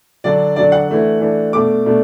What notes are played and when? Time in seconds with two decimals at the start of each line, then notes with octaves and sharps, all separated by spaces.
0.24 D3 F#3 D4 D5
0.56 D3 F#3 D4 D5
0.72 F#5
0.88 E3 A3 D4
1.21 E3 A3 D4
1.53 B2 A3 D4 D6
1.86 B2 A3 D4